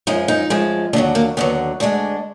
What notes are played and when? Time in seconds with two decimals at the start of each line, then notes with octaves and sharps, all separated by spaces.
0.07 F#2 F3 G#3 D#4
0.28 D#4
0.50 F#2 F3 G#3
0.93 D#2 D4
0.96 D3 F#3
1.15 A#3
1.37 D#2 D3 F#3 B3
1.80 D2 D3 G#3 D4